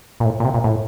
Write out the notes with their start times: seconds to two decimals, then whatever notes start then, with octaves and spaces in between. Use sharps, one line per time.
0.20 A#2
0.25 A2
0.40 A#2
0.45 C3
0.54 A#2
0.64 A2